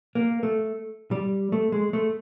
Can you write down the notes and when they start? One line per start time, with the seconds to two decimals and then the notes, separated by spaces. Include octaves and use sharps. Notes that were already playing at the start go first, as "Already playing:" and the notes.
0.15 A#3
0.43 A3
1.11 G3
1.52 A3
1.72 G#3
1.93 A3